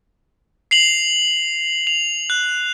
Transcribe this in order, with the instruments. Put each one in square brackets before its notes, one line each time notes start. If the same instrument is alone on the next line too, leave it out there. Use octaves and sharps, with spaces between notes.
[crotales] C7 F7 F#7
F7
F#6